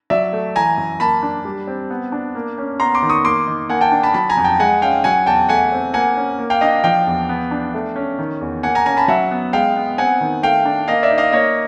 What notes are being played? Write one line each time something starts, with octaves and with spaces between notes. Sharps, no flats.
F#3 D5 E5
A3
E3 G#5 A#5
F#2
A#3 A5 B5
D4
G3
C4
B3
D4
A#3
C#4
B3 A#5 C6
C6 D6
D#3
C#6 D#6
A#3 C6 D6
D#3
A#3 F#5 G#5
G5 A5
D4
A5 B5
F#3 A5 B5
G#5 A#5
F2
G5 A5
G#3 F#5 G#5
C#4 F5 G5
F#3 F#5 G#5
E2 G5 A5
A3 F#5 G#5
C4
A#3 F#5 G#5
C#4
A#3
F5 G5
D4 D#5 F5
F3 F5 G5
E2
B3
D4
A3
C#4
D#3
E2
A#3 F#5 G#5
G#5 A#5
C#4 G#5 A#5
A5 B5
F#3 E5 F#5
B3
G#3 F5 G5
B3
C4 F#5 G#5
D#3
A3 F5 G5
D4
A#3 D#5 F5
D5 E5
D#4
D#5 F5
A#3 C#5 D#5